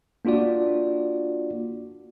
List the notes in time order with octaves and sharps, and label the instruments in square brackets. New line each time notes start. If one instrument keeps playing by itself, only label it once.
[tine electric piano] A#3 D4 F4 F#4 D5